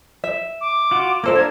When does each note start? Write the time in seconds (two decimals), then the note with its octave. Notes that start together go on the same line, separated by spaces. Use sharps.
0.24 E5
0.61 D6
0.91 F4 F#4
1.24 A#3 F4 A4 A#4 C5 E5
1.35 D4 F5 A5 A#5 G#6